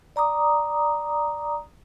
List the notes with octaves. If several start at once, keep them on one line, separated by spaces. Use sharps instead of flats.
D5 A#5 D6 D#6